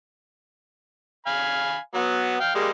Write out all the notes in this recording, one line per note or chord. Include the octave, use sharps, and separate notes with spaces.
F5 G#5 B5
F#3 B3
F5 G5
G3 G#3 A#3